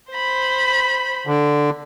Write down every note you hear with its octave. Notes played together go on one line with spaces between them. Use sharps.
C5 B5
D3